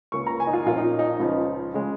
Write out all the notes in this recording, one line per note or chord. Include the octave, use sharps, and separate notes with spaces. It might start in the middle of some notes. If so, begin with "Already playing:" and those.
C#2 C#3 A#3 C#4 C#6
A#5
G#5
D#4
F4
A#1 A#2 A#3 C#4 F4
D#4
D#4
C#2 C#3 F3
C#3 G#3